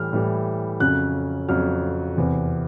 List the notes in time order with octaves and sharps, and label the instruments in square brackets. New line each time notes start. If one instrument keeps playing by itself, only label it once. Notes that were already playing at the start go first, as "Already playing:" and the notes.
Already playing: [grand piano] A2 E3 G3 F6
A2 E3 G3
F2 C#3 F#3 F#6
F2 C#3 F#3 F6
E2 C3 E3